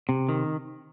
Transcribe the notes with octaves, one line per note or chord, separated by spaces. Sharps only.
C3
D#3